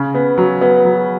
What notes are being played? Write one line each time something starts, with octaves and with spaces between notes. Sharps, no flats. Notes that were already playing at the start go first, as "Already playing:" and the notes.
Already playing: C#3
B3
F#3
B3
F#3